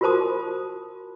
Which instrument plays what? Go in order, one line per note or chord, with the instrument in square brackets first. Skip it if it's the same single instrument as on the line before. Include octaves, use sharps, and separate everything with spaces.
[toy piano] F4 F#4 A#4 C5 A5 D#6